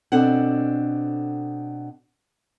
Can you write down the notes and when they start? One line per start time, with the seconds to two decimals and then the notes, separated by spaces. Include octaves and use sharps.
0.12 B2 C4 D4 A4 C5 F#5